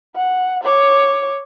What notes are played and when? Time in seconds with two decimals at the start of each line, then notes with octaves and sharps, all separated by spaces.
0.15 F#5
0.63 C#5 D6